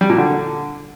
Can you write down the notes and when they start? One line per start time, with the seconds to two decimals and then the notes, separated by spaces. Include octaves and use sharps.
0.01 G3
0.10 A#2
0.18 D3